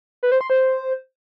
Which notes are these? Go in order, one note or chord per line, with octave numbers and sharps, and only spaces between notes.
B4
C5
C6
C5